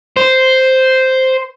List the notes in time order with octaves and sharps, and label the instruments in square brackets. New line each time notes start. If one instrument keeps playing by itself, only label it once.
[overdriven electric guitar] C5